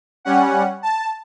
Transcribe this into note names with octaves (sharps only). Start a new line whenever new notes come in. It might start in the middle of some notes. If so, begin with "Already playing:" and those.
G3 C#4 F#5
A5